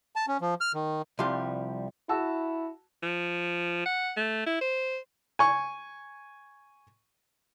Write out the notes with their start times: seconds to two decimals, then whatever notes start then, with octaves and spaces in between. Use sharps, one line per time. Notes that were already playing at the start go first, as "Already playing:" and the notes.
0.16 A5
0.28 C#4
0.41 F3
0.61 F6
0.74 D#3
1.19 C2 F3 G3 G4 F5
2.09 E4 F#4 A5 E6
3.03 F3
3.86 F#5
4.17 A3
4.47 E4
4.61 C5
5.39 G#5 C#6